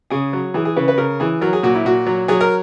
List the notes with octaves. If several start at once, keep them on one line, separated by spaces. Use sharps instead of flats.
C#3 G#4
F#3
E3 G#4
G#4
C#3 B4
B4
C#3 A#4
E3 G#4
F#3 A#4
G#4
A#2 F#4
E4
A#2 F#4
F#3
F#3 G#4
A#4